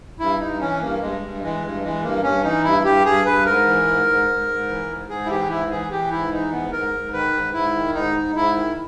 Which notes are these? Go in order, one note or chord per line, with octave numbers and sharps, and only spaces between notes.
G2 E4
G2 D#4
E3 C#4
G2 A#3
G2 G#3
G2
E3 G#3
G2
E3 G#3
G2 A#3
G2 C#4
E3 D#4
G2 E4
G2 G4
G2 G#4
G2 B4
G#2 A#4
E3
G#2
G#2
G#2
G#2
E3
G#2
G#2 G#4
E4
E3 G4
G#2 E4
E3 G#4
E3 G4
G#2 E4
E3 D#4
G#2 B3
G#2 A#4
G#2
D#3 B4
G#2
G#2 E4
D#3
G#2 D#4
G#2
G#2 E4
D#3